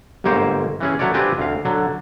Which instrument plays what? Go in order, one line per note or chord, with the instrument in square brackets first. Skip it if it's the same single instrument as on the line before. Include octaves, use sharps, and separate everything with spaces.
[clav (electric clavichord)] G1 G#2 A#3 C5 C#5 G5
E3 C#4 G#4
F#3 A3 F#4 C#5 D5
C4 D4 F4 G4 B4 G#5
D2 F5
D3 F#3